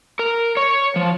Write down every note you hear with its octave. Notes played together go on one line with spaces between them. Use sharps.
A#4
C#5
F3